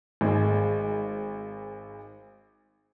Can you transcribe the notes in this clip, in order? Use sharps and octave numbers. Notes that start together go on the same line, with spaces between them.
G#1 G#3